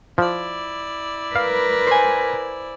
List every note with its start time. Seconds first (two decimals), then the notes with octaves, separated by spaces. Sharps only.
0.18 F3 E4 D5
1.36 A#4 B4 F5
1.87 C5 G#5